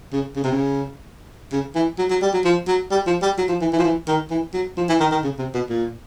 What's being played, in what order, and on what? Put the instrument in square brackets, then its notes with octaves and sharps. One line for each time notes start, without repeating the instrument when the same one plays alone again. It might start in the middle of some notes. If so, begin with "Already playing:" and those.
[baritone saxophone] C#3
C#3
C3
C#3
C#3
E3
F#3
F#3
G3
F#3
F3
F#3
G3
F3
G3
F#3
F3
E3
E3
F3
E3
D#3
E3
F#3
F3
E3
D#3
D#3
C#3
C3
B2
A#2